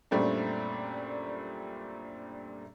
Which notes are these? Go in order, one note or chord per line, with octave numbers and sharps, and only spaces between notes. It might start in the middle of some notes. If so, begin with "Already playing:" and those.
F#2 A#2 G3 A3 C4 D4